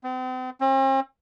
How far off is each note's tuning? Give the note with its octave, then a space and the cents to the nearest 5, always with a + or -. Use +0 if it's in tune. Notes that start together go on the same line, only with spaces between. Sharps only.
C4 -40
C4 +45